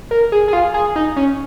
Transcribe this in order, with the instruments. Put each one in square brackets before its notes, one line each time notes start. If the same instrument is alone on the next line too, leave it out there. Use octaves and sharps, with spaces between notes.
[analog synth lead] A#4
G#4
G#4
F4
G#4
D#4
C#4